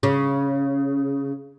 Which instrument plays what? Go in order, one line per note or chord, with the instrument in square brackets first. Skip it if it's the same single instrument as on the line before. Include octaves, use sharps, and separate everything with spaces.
[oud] C#3